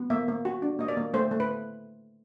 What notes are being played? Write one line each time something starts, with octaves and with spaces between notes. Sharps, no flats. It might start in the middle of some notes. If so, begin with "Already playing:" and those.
Already playing: B3
A#3 E5
A#3
F#4
D4
A#3 D#5
D5
A#3
A3 C5
A3
B4